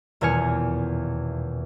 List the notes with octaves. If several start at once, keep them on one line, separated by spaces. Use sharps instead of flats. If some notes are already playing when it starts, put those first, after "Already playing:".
D#1 E2 B2 G#5 F6 C#7